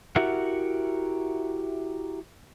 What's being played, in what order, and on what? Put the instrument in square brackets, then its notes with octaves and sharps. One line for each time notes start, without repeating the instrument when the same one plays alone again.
[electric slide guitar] E4 F#4 G4 A#4 E5 F#5